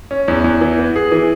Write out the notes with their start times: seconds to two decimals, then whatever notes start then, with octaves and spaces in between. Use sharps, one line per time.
0.11 C#4
0.28 E2
0.44 E2
0.61 E3
0.79 B3
0.96 G#4
1.12 E3